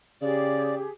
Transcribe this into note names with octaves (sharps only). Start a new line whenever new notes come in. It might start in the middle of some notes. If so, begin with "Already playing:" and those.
C#3 G4 G#4 D5